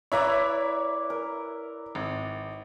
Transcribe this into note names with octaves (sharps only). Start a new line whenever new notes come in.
E4 B4 C#5 D5 E5 A#5
A#4
G#1